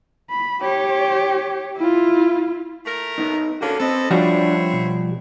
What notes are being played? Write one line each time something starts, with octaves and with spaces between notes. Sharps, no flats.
B5
G4 C#5
E4 F4
A3 A#4
B3 D#4
D3 A#3 C#4 F#4 A4
C4 A4 B4 D#5
F3 G3 C4 D4 E4 F#4 C#5
B2